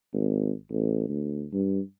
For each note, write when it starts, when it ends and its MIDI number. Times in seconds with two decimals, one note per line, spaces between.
0.13 0.52 32
0.71 1.06 33
1.09 1.45 38
1.53 1.80 43